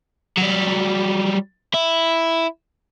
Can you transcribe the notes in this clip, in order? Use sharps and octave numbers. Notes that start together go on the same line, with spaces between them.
F#3 G3
E4